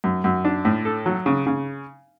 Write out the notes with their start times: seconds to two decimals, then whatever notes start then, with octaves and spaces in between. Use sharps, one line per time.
0.04 F#2
0.24 F#2
0.45 D4
0.65 A2
0.85 A4
1.06 F#3
1.26 C#3
1.47 C#3